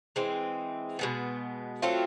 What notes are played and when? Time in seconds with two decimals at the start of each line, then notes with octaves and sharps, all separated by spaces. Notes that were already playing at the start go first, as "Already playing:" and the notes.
0.16 E3 G#3 C4
0.99 B2 G#3 B3
1.82 F#3 A3 C4 F4